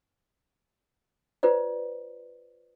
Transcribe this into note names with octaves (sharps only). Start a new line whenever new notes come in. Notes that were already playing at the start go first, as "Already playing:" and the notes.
F4 B4 C5 D5